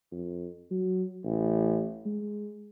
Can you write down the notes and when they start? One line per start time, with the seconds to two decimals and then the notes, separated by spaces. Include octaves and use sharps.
0.12 F2
0.71 F#3
1.24 A1
2.06 G#3